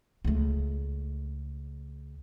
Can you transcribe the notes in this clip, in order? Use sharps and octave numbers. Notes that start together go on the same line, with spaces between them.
C#2 A3